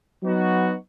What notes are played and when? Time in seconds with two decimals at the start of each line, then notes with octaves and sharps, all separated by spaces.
0.22 F#3 B3 D#4 F#4